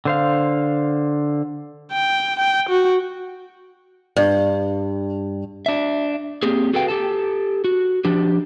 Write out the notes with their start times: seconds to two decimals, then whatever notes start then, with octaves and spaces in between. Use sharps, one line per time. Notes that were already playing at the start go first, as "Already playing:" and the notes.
0.05 D3 C5 F5
1.92 G5
2.40 G5
2.69 F#4
4.16 G2
5.66 D4 E5
6.43 A#3 C4 G4 G#4
6.73 F#4 G#4 A4 B4 F5 G5
6.88 G4 A4 A5
7.64 F#4
8.05 F3 D4 G4